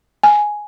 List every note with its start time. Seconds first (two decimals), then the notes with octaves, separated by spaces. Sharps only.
0.23 G#5